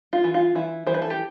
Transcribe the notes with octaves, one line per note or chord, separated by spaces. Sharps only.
F4
E3
F4
E3 E4
E3 C5
B4
A4
G4